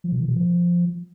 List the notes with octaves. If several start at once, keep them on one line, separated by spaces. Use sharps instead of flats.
F3
C3
E3
B2
F3